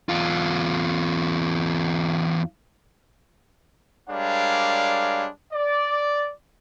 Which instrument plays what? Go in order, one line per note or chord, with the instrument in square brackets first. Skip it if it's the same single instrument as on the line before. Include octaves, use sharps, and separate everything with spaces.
[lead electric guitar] E2 F4
[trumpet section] G3 G#3 D4 A#4 C#5 F5
D5